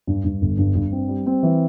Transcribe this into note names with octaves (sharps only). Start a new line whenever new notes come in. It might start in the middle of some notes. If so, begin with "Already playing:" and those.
G2
G2
G1
G2
G2
C4
G3
C4
E3